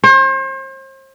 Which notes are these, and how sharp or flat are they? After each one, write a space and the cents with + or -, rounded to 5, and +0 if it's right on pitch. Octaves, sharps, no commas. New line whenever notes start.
C5 +40